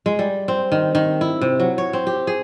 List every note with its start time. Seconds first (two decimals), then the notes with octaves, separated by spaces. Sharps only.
0.06 G#3
0.19 G3
0.48 C4
0.72 D#3
0.95 D#3
1.21 E4
1.41 C3
1.60 F#3
1.78 C#5
1.93 C4
2.07 G4
2.27 G#4